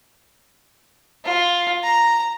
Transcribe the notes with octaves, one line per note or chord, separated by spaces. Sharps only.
F4
A#5